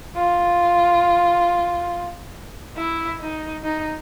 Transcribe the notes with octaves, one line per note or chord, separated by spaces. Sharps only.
F4
E4
D#4
D#4